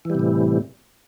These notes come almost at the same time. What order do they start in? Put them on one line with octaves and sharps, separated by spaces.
E3 G3 C3 A2